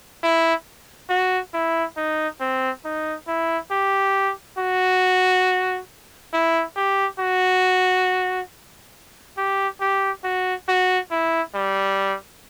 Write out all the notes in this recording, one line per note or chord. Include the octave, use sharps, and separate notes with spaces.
E4
F#4
E4
D#4
C4
D#4
E4
G4
F#4
E4
G4
F#4
G4
G4
F#4
F#4
E4
G3